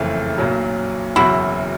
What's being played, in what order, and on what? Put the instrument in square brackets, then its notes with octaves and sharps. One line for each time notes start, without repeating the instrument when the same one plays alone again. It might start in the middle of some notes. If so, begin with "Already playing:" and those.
Already playing: [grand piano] F#1 F2 C#3 E3 A3
B1 A#2 F#3
[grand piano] F#1 E2 B2 F#3 [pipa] E4 F#4